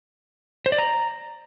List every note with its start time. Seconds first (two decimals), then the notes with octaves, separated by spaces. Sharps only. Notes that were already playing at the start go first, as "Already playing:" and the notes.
0.66 C5
0.72 D5
0.78 A#5